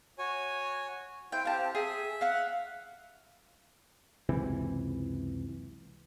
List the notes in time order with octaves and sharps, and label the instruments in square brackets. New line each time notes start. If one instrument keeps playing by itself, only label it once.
[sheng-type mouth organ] F#4 C#5 G#5
[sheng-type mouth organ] E4 C5 [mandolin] G5
[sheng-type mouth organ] C4 G4 [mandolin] F5 A5
[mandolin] G#4 [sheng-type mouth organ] E5
[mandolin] F5 F#5
[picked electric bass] F#1 C#2 C3 E3